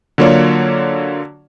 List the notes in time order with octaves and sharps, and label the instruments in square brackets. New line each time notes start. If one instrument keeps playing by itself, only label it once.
[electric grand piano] D3 F#3 A#3 F4 C#5 D5